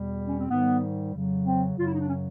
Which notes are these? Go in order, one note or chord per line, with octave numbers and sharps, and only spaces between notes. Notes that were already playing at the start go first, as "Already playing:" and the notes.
Already playing: E2 B2 G3
C#4
C4
G#2 D#3 G3 B3
F2 C#3 F#3
C4
F#2 C#3 F#3 F4
E4
D#4
D4
C#4